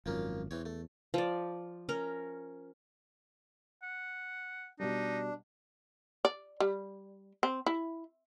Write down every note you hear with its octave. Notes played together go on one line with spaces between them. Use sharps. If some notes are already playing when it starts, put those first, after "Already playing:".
G#1 F#2 F3 A#3 C#4
E2 E3 C4 C#5
A3
F3 D5
C#4 A#4
F#5
B2 G3 D4 D#4
D5
G3
C4
E4